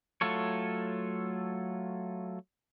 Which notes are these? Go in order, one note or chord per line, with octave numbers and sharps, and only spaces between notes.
F#3 A3 F4 A4 C#5